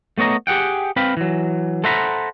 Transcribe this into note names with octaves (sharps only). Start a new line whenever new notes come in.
A3 B3 C#5 D#5 A#5
G4 G#4 F#5 G5
C4 B4 F5 G5 B5
E3 F#3
A4 C5 E5 F#5 A#5 B5